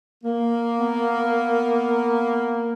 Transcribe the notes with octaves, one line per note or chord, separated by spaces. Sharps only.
A#3
B3